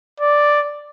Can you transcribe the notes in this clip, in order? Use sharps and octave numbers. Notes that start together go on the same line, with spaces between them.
D5